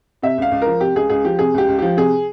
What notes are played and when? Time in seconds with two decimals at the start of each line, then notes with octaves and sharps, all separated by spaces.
0.22 C3 E5
0.38 C#2 F5
0.51 C#2
0.62 F3 A#4
0.81 C3 G4
0.95 C#2 G#4
1.10 C#2 G#4
1.24 F3 G4
1.39 C3 G#4
1.54 C#2 G4
1.68 C#2
1.78 F3 G4
1.97 C3 G#4